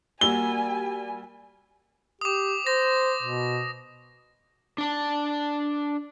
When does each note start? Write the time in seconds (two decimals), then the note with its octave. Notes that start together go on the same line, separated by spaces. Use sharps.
0.21 G3 A#3 F#4 G#5 E6 G#6 G7
2.21 G4 D6 D#6
2.67 C5 A#6
3.23 B2
4.78 D4 D5 A5